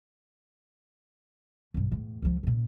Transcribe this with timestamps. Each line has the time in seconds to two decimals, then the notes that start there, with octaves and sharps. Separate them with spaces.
1.74 B1 G2
1.92 E2 A2
2.22 C#2 F3
2.43 A#2 C#3